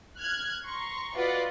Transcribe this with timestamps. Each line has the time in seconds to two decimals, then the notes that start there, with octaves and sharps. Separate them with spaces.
0.18 F6 F#6 G#6
0.65 A#5 C6 C#6
1.15 F4 F#4 B4 D5 D#5 F#5